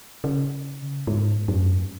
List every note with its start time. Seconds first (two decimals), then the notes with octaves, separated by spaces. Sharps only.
0.24 C#3
1.07 G#2
1.48 F#2